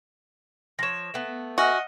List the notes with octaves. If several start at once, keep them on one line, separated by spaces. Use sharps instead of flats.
F3 C#5 A#6 E7
A3 B3
F#4 D#5 E5 F#5 G#5 F6